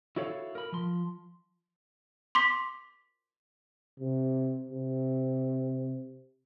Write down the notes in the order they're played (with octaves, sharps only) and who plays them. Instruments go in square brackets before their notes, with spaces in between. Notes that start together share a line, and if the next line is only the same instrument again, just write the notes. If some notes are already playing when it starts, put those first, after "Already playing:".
[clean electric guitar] E4 F#4 A4 C#5 F5
A#4 B5
F3 C6
[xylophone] C6 D6 B6
[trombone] C3
C3